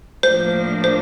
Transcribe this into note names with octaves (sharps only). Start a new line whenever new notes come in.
A2 F3 A#3 D4 C5
C5